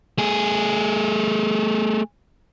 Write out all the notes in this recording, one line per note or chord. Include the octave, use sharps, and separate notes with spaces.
A3 G#4